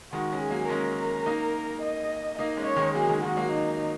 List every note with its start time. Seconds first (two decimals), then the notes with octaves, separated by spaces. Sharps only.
0.13 D#3 G#3 F#4
0.32 G#3 C#4
0.42 G#4
0.51 F#3 A#3
0.69 G#3 C#4 A#4
1.26 A#3 D#4
1.82 D#5
2.39 A#3 D#4 D#5
2.57 G#3 C#4
2.67 C#5
2.76 D#3 G#3
2.95 F#3 A#3 G#4
3.09 D#3 G#3
3.23 D#3 G#3 F#4
3.37 F#3 A#3
3.52 D#4